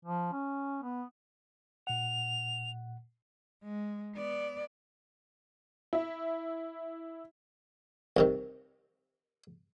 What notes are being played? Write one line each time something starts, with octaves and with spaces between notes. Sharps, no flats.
F3
C#4
B3
A#2 F#5 F7
G#3
B3 D5
E4 E5
C2 C3 D#3